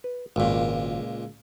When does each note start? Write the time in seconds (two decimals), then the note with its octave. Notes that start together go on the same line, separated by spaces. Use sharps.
0.04 B4
0.36 G#1 C#2 A#2